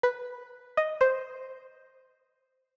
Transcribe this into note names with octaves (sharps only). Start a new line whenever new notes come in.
B4
D#5
C5